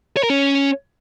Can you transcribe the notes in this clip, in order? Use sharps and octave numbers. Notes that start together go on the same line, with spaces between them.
C#5
A#4
C#4